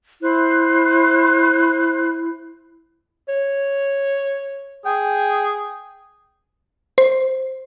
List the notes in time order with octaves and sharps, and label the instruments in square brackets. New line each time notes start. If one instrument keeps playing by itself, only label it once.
[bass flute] E4 [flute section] C5 F#6
[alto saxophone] C#5
[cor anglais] G#4 [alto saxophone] G5
[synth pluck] C5